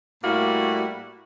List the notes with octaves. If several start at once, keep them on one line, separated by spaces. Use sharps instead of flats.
A2 G3 A#3 E4 F#4